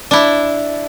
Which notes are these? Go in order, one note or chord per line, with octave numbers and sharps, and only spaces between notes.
D4 E4